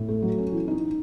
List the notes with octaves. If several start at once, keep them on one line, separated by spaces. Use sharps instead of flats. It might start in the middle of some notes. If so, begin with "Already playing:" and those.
Already playing: A2
A3
F#3
C#4
E3
D#4